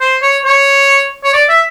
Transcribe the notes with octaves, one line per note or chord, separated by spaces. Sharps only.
C5
C#5
C#5
C#5
D5
E5